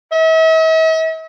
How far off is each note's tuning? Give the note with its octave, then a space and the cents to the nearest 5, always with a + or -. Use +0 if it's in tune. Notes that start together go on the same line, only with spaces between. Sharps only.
E5 -45